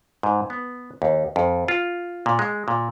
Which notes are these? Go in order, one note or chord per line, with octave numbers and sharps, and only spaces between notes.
G#2
B3
D#2
F2
F4
A#2
G#3
A#2